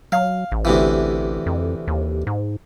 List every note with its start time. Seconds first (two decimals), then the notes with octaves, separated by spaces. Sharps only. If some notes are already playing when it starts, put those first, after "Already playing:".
0.12 F#3 F5
0.52 A1
0.65 D2 C3 E3
1.46 F2
1.88 D#2
2.27 G#2